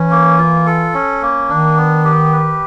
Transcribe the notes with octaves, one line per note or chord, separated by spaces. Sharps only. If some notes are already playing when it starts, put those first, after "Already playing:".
Already playing: E3 C#4
A#3
F4
A4
C#4
A#3
D#3 D4
B3
G4
B4